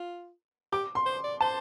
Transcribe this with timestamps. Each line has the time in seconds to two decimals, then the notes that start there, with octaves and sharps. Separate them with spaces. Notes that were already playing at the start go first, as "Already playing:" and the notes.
Already playing: F4
0.72 G4 D6
0.95 C6
1.06 C5
1.24 D5
1.41 C5 A5